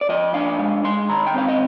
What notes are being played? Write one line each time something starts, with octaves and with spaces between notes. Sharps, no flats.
D5
F3 D#5
D4 F5
G#3
G#3 C6
D#3 A#5
G5
C4 F5
D#5